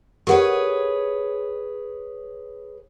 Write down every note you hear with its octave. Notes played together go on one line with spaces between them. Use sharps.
G4 G#4 A#4 B4 C#5 F#5